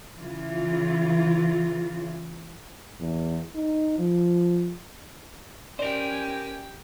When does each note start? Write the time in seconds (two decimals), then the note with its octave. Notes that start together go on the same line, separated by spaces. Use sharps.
0.16 C#3 E3 F4
2.99 E2
3.55 D#4
3.98 F3
5.79 C#4 G4 A#4 C5 D5 G5 G#5